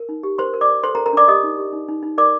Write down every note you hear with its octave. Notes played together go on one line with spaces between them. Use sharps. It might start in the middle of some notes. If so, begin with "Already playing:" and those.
Already playing: A#4
D#4
G4
A#4 C5 C6
A#4
D5 D6
A#4
A4 C5 C6
A#4 A#5
C5
A#4 A#5
D4 D5 D6
G4 D#5 D#6
D#4
G4
D#4
D#4
D#4
A#4 D5 D6